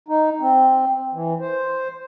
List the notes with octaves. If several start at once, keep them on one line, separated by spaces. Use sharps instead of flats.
D#4
C4
E3
C5